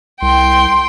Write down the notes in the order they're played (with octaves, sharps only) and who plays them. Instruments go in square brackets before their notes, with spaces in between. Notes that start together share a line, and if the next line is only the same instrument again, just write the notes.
[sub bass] C2 [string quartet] G5 C6